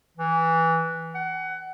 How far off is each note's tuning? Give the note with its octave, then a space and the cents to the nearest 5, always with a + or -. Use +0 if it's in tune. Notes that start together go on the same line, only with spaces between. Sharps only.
E3 -10
F#5 +25